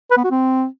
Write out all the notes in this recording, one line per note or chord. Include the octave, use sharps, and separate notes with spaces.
B4
B3
F#4
C4